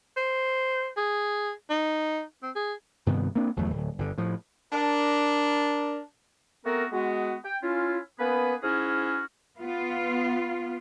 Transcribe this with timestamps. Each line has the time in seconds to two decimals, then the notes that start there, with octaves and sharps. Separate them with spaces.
0.17 C5
0.97 G#4
1.70 D#4
2.43 C4
2.56 G#4
3.07 G2 C3 D#3 B3
3.35 A#3 C4 D4
3.56 G1 E2 F#3 A3
3.70 D1
3.99 G1 D3
4.18 A2 F3
4.72 D4 A#4
6.65 A3 B3 C4 F#4 A#4
6.92 G#3 B3 F#4
7.45 G5
7.63 C#4 E4 F4
8.19 A#3 B3 C#4 G#4 B4
8.63 G#2 C#4 E4 F#4 G#4 F6
9.58 B3 F4